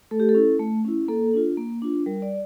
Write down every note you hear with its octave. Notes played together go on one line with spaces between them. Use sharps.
A3 A4
G4
A4
C#4 E4
A3
C#4 E4
A#3 A4
D4 F4
A#3
D4 F4
G3 A#4
D5